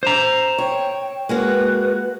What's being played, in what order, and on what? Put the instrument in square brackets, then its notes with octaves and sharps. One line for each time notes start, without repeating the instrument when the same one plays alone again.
[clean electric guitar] C5 A#5
[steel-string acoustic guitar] C#5 [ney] G5
[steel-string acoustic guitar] G#3 A#3 F#4 [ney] B4